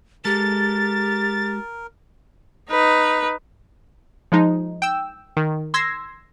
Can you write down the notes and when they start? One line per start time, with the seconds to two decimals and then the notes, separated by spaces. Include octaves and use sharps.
0.25 G#3 G4 A4 A#4 A6
2.70 D#4 B4
4.32 F3 G#3 D#4
4.82 G5 E6
5.37 D#3
5.74 C6 E6 G#6 A#6 C7